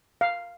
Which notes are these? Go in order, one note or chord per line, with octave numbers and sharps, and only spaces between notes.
F5